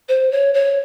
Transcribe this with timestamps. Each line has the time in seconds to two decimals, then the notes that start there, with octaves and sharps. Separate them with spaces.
0.09 C5
0.32 C#5
0.54 C#5